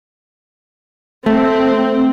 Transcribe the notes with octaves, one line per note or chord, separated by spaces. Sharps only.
A3 C4